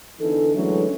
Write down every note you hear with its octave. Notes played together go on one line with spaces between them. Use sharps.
E2 D3 E3 D#4 A4
D3 E3 F#3 G#3 A3 C#4